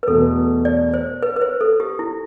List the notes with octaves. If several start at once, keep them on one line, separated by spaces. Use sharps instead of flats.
B4
E2 B2 A3 A4
D5
C5
B4
B4
C5
A4
G4
E4